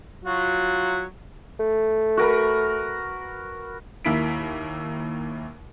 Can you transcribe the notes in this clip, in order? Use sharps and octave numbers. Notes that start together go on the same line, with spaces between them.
F#3 F4 F#4
A3
F#4 A#4 B4
D#2 A#3 E4 B6 D7